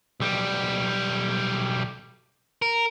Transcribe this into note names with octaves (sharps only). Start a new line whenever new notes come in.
B1 G3
A#4